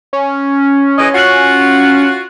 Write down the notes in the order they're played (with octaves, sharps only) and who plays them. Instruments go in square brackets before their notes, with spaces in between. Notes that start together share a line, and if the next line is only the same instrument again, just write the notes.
[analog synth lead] C#4
[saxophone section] E3 G#3 D#5 [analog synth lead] C#4
[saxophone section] F4 F#4